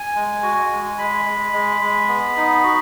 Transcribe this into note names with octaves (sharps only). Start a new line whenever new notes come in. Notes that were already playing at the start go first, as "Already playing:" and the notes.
Already playing: G#5
G#3
F#4
G#3
G#3 B5
G#3
G#3
G#3
B3
D#4
F#4